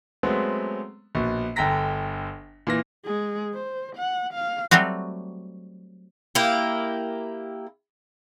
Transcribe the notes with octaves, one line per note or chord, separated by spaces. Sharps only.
F#3 G#3 A3 B3 C4
A#1 B2
G1 D3 G5 A#5 A#6 B6
A#2 E3 A#6
G#3 G#4
C5
F#5
F5
F#3 G3 A3 C4 F#4
A#3 E4 G4